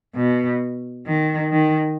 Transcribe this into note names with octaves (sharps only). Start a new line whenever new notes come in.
B2
D#3
D#3